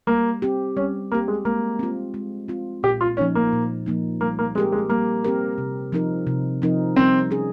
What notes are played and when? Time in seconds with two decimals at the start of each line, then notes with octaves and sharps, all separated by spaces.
0.07 G3 A#3
0.42 C4 G4
0.77 G3 C#4
1.11 A#3 C4
1.15 G4
1.28 G#3
1.45 G#3 A#3
1.79 C4 F4
2.14 G#3
2.48 C4 F4
2.83 A#2 G4
3.01 F4
3.17 F3 A#3 C#4 D#4
3.35 A#3
3.53 A#2
3.86 F3 A#3 D#4
4.21 G3 A#3
4.39 A#3
4.55 G#3 C4 G4 A#4
4.72 G#3
4.89 G3 A#3
5.24 C4 G4 A#4
5.58 C3
5.92 F3 C4 D#4 A#4
6.27 C3
6.62 F3 C4 D#4 A#4
6.96 G3 C4
7.31 C#4 G#4